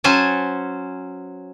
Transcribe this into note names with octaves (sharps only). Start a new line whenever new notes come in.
F#3 C#4 C5 G#5 A5